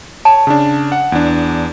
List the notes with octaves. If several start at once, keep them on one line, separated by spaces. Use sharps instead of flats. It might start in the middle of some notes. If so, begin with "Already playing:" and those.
C#5 A5
C#3 D4
F#5
E2 D4